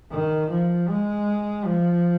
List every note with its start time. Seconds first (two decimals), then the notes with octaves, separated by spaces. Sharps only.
0.11 D#3
0.50 F3
0.89 G#3
1.65 F3